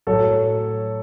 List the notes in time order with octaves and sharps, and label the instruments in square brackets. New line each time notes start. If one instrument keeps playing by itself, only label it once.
[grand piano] A2 F#3 A3 A4 C#5